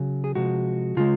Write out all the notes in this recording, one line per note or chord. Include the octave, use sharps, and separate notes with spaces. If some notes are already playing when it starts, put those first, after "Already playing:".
Already playing: C#3 F#3
G#4
C3 F3 G#3 F#4
C#3 G#3 F4